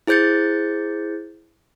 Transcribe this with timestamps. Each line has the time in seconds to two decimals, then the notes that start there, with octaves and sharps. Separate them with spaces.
0.07 E4 G#4 C5 G6 A6 C#7